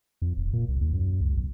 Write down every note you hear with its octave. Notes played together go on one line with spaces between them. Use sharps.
F2
D#1
A#2
C2
D#2
F#2
C#2
B1